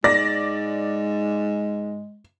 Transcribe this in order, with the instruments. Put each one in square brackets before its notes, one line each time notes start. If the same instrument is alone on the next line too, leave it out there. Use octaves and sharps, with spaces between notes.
[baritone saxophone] G#2 [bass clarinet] G#3 [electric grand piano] D5 [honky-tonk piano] A#6